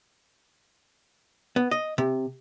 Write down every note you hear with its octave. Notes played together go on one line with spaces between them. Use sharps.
B3
D#5
C3